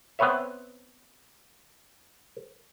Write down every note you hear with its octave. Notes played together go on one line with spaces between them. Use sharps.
B3 C4 B4 C#5 E5